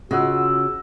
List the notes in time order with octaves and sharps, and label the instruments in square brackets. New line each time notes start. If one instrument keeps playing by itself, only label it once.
[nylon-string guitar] C#3 [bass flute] F4 [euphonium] F#4 [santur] D#5 F#5 E6